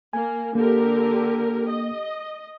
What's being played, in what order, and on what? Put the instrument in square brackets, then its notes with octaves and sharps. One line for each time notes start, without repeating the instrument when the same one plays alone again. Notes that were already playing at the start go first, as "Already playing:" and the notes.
[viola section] A#3 [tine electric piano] G#5
[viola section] D3 G4 A#4 [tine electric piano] A#3
[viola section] D#5